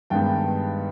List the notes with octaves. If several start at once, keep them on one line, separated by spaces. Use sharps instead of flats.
G2 D#3 G#3 B3 G5 A5